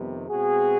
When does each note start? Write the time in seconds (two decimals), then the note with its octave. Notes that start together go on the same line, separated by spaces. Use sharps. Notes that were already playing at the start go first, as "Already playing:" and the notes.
Already playing: F2 C3 D#3 G3 B3
0.29 B2 G#3 C4 F#4 G#4